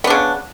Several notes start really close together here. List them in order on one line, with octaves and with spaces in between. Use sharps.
B3 D4 C#3